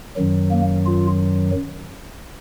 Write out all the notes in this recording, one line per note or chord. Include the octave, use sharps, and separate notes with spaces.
F#2 D#3 F#3
A#3
F4